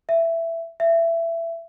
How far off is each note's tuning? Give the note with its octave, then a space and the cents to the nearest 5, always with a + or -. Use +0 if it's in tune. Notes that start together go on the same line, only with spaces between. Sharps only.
E5 +10
E5 +20